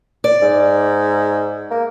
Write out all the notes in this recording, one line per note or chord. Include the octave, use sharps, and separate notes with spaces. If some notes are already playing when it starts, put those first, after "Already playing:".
D5
G#2
A#3